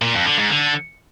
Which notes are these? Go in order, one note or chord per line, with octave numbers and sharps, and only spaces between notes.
A#2
F2
D3
G#2
D3